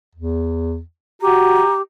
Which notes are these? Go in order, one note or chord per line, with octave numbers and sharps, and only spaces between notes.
E2
F#4 G4 A#5